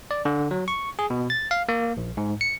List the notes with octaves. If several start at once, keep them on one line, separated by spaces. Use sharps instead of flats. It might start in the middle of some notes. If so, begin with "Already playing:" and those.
D5
D3
F#3
C#6
G#4
B2
A6
F5
A#3
A#1
G#2
C#7